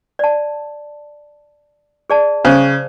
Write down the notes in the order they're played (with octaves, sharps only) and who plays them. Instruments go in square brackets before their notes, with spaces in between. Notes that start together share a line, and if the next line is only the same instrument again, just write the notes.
[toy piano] D5 A5
G#4 D5 A5
[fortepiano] C#3 [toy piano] G#4 C5